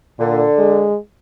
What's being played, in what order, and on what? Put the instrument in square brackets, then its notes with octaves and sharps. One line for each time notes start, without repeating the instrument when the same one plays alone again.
[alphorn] A#2 [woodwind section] D3
[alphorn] G#3